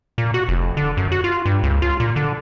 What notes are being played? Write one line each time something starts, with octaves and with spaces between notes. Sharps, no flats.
A#2
F#4
F1
D3
F#2
F#4
F4
G2
C#2
F4
A#2
D3